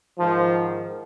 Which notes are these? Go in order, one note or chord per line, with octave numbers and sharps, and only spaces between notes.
G#2 D#3 F3